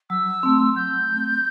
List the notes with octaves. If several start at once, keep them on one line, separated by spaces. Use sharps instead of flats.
F#3 E6
A3 C4
F#3 G6
A3 C4